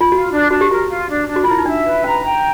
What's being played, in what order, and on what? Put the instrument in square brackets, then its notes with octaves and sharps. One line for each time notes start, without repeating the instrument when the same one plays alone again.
[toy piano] F4
[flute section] F4 [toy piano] F#4
[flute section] D4
[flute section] D4 [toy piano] F#4
[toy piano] G4
[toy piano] F#4 [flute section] A#4
[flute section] F4
D4
D4
[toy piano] F#4
[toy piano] F4 [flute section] A#4
[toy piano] E4
D#4
[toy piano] D4 [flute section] E5
[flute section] B4
[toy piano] C#4 [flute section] A#5
[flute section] G5